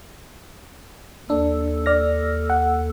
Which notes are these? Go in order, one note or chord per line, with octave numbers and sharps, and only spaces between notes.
D#2 D4 A4
D5 F6 A#6
F#5